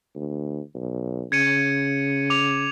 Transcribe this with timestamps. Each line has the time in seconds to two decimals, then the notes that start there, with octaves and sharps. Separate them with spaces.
0.15 D2
0.75 B1
1.32 C#3 G#6 C#7 D#7
2.30 D6 F7